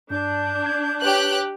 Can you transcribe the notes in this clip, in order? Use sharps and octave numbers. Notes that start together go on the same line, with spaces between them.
G2 D4 G6
G#6
G4 B4 C#5 F#6